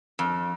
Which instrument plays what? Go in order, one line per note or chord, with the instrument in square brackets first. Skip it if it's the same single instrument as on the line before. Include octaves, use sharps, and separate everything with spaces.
[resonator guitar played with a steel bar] F2